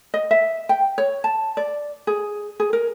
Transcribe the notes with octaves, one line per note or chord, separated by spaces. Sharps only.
D#5
E5
G5
C#5
A5
D5
G#4
G#4
A#4